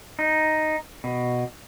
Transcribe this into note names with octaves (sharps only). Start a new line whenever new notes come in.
D#4
B2